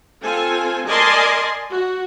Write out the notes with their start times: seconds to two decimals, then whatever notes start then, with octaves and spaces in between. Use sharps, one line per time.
0.23 C4 F4 A4 G#5
0.87 A#4 D5 D#5 G#5 A5 C6
1.70 F#4